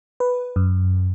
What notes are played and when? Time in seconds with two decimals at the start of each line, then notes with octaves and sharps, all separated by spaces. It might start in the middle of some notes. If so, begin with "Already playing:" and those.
0.20 B4
0.56 F#2